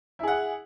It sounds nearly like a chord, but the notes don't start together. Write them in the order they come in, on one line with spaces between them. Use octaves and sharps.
E4 G#4 F#5